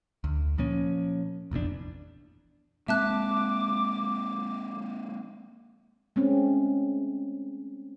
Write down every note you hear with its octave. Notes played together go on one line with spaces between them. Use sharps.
D2
A#2 F3 A#3 C#4
F1 A#1 E2 D4
G#3 A#3 C4 E5 A5 D6 F#6
G#3 A3 C4 C#4